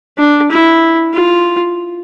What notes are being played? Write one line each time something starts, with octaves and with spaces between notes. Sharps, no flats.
D4
E4
F4